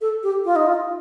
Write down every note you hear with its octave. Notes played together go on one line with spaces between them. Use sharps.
A4
G4
F4
D#4
F4